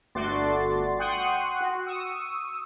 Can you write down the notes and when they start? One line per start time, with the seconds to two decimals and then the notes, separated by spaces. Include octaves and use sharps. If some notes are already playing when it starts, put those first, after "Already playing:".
0.15 G1 A3 F#4 D5 C6 A6
0.99 F#5 G5 C6 C#6 D#6 F#6
1.61 F#4
1.86 C#6 D#6 E6